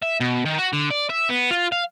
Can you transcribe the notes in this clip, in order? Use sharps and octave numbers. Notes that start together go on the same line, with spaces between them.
E5
B2
D#3
F#4
D3
D5
E5
B3
F4
F5